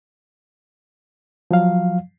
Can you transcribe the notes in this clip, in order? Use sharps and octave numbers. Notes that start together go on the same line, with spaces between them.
F3 F#3 F5